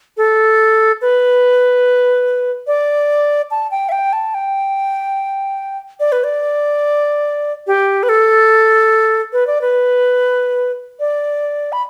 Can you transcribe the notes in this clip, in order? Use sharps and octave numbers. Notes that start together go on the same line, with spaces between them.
A4
B4
D5
A5
G5
E5
G5
A5
G5
D5
B4
D5
G4
B4
A4
B4
D5
B4
D5
B5